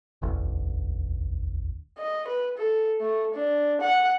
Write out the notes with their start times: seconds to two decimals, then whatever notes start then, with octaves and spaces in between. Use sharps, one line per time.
0.22 E1 A1 D2
1.98 D#5
2.28 B4
2.58 A4
3.01 A3
3.35 D4
3.81 F#5